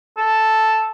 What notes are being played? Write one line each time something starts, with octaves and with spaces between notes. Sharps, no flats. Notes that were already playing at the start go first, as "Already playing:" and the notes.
A4